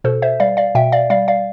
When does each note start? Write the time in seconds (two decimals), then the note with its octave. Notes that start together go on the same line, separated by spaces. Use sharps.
0.04 B2 A4 C5
0.22 C5 E5
0.40 G3 D5 F5
0.57 D5 F5
0.75 B2 E5 G5
0.92 D5 F5
1.10 G3 D5 F5
1.28 D5 F5